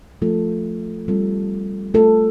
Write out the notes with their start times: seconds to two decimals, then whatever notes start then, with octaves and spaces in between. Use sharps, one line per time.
0.22 F3 A3 F4 A4
1.08 G3 C4 F4 A4
1.94 A3 F4 A4